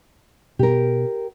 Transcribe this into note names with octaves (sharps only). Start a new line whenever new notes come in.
B2 G4 A#4